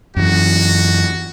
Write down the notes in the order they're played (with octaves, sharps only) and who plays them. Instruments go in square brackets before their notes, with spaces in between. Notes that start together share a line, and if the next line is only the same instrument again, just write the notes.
[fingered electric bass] F#2 E3 [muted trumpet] F#4